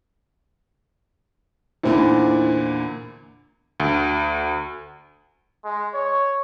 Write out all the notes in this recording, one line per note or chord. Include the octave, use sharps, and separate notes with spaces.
E2 A#2 D3 D#4 E4 C5
D2
G#3
C#5